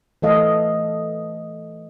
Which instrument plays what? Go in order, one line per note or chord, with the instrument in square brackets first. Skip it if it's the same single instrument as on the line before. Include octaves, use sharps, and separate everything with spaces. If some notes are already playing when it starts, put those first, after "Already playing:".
[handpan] E3 A3 A4 D#5 F5